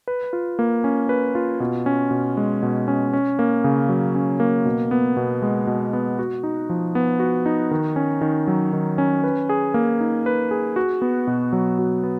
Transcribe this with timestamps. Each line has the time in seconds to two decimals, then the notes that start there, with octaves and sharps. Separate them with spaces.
0.08 B4
0.33 F4
0.59 A#3
0.84 C#4
1.09 B4
1.35 F4
1.60 B2
1.86 C#4
2.11 B2
2.37 G#3
2.62 B2
2.88 C#4
3.13 C#4
3.39 A#3
3.64 C#3
3.89 F#3
4.15 C#4
4.40 A#3
4.65 B2
4.91 B3
5.17 B2
5.42 G#3
5.67 B2
5.93 B3
6.19 F#4
6.43 D#4
6.70 F3
6.95 B3
7.20 F#4
7.46 D#4
7.71 D#3
7.96 C#4
8.21 D#3
8.47 F#3
8.73 D#3
8.98 C#4
9.24 B4
9.49 G#4
9.74 A#3
10.00 D#4
10.26 B4
10.51 G#4
10.76 F#4
11.02 B3
11.27 B2
11.53 F#3
11.79 F#4
12.04 B3